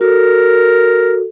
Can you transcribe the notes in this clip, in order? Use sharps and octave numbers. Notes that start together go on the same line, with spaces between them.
F#4 A4 A#4